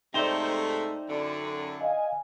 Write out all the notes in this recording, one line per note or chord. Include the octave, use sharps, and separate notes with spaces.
G#2 C3 A3 D#4 C5 D5 E5 G5
F#2 D3
D#5 F5 G#5